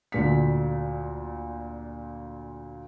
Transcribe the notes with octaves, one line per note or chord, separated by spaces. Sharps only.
D2 A#2 B6